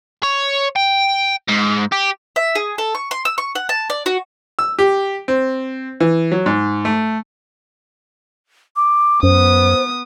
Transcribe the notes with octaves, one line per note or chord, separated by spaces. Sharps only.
C#5
G5
G#2
G4
E5
G#4
A4
C#6
C6
E6
C#6
F#5
A5
D5
F#4
E6
G4
C4
E3
F#3
G#2
A3
D6
F#2 B3 C5 D#6